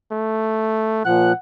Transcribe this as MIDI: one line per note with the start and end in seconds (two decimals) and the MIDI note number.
0.11 1.02 57
1.05 1.32 46
1.05 1.32 53
1.05 1.38 78
1.05 1.32 90